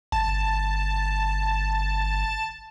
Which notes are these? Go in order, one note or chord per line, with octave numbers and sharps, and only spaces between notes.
G1 A5